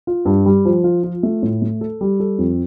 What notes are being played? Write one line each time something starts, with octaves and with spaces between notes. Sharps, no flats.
F4
G2
G3
F3
F4
F4
A3
A2
A3
A4
G3
A4
F2